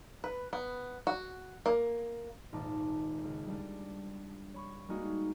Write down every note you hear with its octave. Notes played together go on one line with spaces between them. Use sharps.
B4
B3
F#4
A#3
D#1 G#1 D#4 A5 D6
C#2
G3 D4
C#5 B5 C#6
G3 G#3 A#3 D#4 F#4 G#4